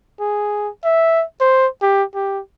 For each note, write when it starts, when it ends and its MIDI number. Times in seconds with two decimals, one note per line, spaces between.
0.20 0.69 68
0.84 1.24 76
1.41 1.67 72
1.82 2.03 67
2.15 2.40 67